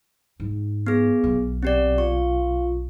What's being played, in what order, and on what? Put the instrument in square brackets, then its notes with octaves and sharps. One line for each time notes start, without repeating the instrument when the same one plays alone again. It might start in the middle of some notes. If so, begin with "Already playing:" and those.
[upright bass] G#2
[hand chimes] B3 G#4
[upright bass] B1
[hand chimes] C4 G4 D5
[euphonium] F4 [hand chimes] C#6